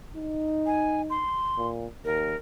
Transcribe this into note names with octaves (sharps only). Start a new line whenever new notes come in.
D#4
G#5
C6
A#2
D#2 A#4